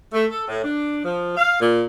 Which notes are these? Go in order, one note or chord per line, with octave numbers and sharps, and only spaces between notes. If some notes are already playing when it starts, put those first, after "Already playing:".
A3
A4
A2
D4
F3
F5
A#2